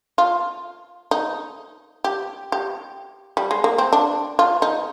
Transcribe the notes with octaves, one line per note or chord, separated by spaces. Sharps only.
F4
D#4
G4
G4
G3
G#3
A#3
C4
D4
F4
D#4